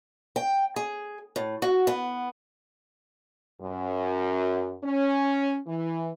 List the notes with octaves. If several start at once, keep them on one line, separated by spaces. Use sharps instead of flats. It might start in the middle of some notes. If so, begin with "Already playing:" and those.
G5
G#4
A2
F#4
B3
F#2
C#4
E3